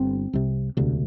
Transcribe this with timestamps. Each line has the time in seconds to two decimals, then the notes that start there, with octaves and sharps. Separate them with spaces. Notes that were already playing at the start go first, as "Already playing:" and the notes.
Already playing: G1 C4
0.33 C2 C3
0.77 E1 D2 C3